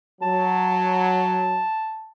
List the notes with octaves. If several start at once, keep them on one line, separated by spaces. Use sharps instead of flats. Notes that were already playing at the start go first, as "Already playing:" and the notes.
F#3 A5